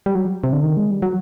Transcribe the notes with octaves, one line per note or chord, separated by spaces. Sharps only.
G3
F#3
C3
D3
D#3
G#3
G3
F#3